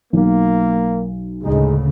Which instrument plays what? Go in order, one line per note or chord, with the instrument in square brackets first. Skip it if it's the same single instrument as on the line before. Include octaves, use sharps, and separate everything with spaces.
[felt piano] B1 [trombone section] A#3
[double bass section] D2 A2 C#3 [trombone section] G#3 D#4 G#4